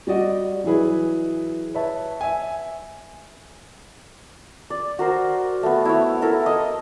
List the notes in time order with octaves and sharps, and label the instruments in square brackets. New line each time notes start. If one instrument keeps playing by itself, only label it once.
[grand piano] G3 F#4 D5 D#5 F#5
E3 F#3 E4 G#4 B4
B4 C#5 E5 A5
E5 G#5
[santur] D5
F#4 A#4 C5
A3 B3
E4 C#5
E4 A4 A#4
D#5